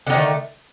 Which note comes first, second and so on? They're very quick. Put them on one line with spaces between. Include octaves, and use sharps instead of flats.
D3 D#3 C#4 A3